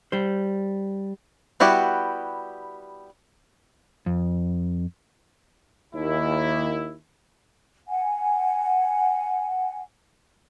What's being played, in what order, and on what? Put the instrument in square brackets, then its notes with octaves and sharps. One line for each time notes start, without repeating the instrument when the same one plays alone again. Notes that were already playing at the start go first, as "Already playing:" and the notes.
[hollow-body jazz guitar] G3 C5
[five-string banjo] G3 B3 E4 F#4 G4
[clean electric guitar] F2
[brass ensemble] D#2 E4
[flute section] F#5 G#5